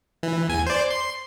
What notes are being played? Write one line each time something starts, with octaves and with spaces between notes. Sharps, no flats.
E3
E2 G#5
C5 D5
C6